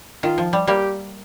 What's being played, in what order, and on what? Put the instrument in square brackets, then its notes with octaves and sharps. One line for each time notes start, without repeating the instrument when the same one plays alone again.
[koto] D#3 [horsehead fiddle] F4
[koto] F3
G3
[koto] G3 A#3 [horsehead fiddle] G4